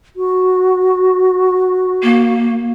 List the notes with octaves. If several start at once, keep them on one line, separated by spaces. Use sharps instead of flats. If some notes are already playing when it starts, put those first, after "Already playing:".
F#4
A#3